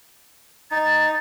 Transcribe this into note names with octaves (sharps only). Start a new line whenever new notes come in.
D#4 A6